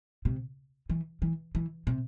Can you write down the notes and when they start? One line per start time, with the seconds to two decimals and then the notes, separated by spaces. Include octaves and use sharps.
0.25 C3
0.90 E3
1.22 E3
1.55 E3
1.87 C3